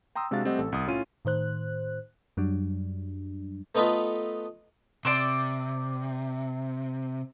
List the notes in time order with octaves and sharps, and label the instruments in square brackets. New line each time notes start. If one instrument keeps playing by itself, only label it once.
[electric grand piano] G5 A#5 C6 D#6 E6
C3 G#3 D4 F#4 F5 A6
G3 A3 C4 G4 D#5 F#5
A1 A4
C2 D#6
A2 C#4 F4 D#7
[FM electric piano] A2 D#3 C5 F#6
F#2 F#3 G3 D4
[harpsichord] A3 B3 D#4 F4 A4 B4
[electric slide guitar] C3 [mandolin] D5 C6 E6